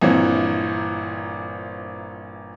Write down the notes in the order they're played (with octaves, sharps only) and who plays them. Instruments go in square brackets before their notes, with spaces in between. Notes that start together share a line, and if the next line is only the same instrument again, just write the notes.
[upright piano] G1 A#2 E3 C4